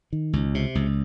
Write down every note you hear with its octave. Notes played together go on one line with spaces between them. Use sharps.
D#3
C#2
C3
C#2